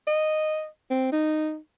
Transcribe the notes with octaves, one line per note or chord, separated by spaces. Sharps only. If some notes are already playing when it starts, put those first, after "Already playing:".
D#5
C4
D#4